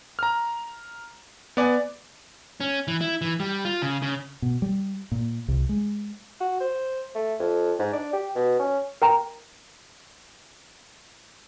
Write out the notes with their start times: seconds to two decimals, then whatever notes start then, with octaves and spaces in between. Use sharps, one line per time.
0.19 A#5 F6
1.57 B3 D5 G#5
2.60 C#4
2.88 E3
3.01 E4
3.21 E3
3.40 G3
3.65 F4
3.82 C#3
4.02 C#3
4.42 B2
4.62 G3
5.12 A#2
5.48 C2
5.69 G#3
6.40 F#4
6.60 C5
7.15 A3
7.39 F2
7.79 G#2
7.93 D4
8.13 G4
8.35 B2
8.59 C#4
9.02 A#4 G5 A#5